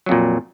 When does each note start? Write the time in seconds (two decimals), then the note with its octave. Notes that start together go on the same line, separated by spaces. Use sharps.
0.06 F#3
0.09 F2
0.12 A#2